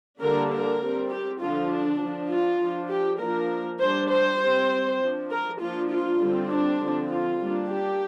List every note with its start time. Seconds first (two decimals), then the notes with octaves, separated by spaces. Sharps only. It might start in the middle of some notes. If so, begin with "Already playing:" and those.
0.20 D3 G3 A#3 D4 A#4
0.51 A#4
0.80 G3 C4
1.10 G4
1.40 D3 F3 D4 F4
1.70 D4
1.99 F3 D4
2.30 F4
2.60 F3 D4
2.89 G4
3.19 F3 A#3 D4 A#4
3.80 G3 D4 C5
4.10 C5
4.40 G3 C4
5.00 F3 D4
5.30 A#4
5.60 F3 A#3 D4 F4
5.90 F4
6.20 D3 G3 C4
6.50 D4
6.79 D3 F3 C4
7.10 F4
7.39 G3 A#3 D4
7.69 G4